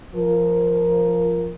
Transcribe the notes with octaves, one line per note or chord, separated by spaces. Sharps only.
F3 A#4